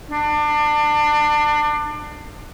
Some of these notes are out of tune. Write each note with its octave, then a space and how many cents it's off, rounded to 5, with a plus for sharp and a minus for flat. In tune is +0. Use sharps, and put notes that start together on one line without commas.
D4 +25